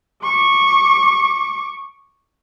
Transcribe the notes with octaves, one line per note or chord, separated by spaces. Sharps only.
C#6 D6